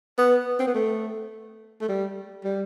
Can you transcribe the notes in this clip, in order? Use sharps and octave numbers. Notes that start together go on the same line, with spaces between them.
B3
C4
B3
A3
A3
G3
G3